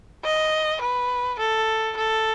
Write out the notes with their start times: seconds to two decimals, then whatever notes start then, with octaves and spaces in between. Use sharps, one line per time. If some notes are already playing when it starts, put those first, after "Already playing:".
0.24 D#5
0.81 B4
1.39 A4
1.97 A4